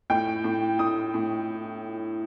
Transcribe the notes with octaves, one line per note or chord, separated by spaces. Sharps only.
A2 G5
A2
A2 D#6
A2